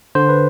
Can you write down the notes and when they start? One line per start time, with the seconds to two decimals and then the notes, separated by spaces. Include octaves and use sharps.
0.15 D3 C5
0.29 B4